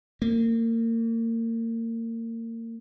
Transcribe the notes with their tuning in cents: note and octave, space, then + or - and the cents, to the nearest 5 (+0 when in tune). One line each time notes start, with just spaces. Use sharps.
A#3 -35